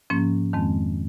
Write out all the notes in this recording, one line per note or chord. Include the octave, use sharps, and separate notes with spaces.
G#2 F3 A#3 C#4
F2 D#3 G#3 C4